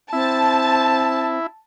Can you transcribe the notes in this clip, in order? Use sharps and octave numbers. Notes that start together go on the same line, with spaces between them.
C4 E4 A5